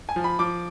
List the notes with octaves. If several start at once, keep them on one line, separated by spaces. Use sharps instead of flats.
G#5
F3
B5
F3 D6